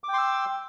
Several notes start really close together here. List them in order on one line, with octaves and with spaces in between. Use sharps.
D6 G5 C6 E6